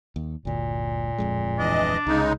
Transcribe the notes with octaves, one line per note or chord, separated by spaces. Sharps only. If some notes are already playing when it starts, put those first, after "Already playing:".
D#2
G1 D2 A#2
D1 F2 G#3
E3 D4 D#5
C2 C#3 G#3 D#4